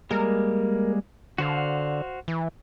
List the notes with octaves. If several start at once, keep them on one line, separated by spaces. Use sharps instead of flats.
G3 G#3 A#3 A#4
D3 F#4 C5 F5
E3